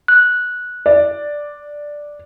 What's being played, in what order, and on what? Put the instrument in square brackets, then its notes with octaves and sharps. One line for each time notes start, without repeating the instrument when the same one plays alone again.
[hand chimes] F#6
[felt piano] D5